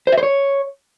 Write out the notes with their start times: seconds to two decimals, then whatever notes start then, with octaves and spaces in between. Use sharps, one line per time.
0.07 C5
0.12 E5
0.18 C5
0.23 C#5